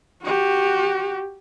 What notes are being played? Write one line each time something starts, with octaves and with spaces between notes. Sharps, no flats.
F#4 G4